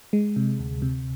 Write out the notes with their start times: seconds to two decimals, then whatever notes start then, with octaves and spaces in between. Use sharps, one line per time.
0.13 G#3
0.36 C3
0.59 D2
0.82 C3